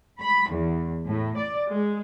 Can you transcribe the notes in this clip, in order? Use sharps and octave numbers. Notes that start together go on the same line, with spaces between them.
B5
E2
A2
D5
G#3